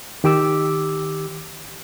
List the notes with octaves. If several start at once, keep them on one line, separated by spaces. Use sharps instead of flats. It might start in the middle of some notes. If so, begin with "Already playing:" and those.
D#3 G4 D6 E6